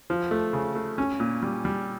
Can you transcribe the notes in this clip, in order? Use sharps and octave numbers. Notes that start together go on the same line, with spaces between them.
F3
A3
C#3
A3
C#4
A#2
G3
G3